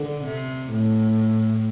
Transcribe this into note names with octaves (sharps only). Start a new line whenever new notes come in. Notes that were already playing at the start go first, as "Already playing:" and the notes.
Already playing: D3
C3
A2